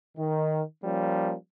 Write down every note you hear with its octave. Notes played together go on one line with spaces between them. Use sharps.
D#3
F3 G3 A#3 C#4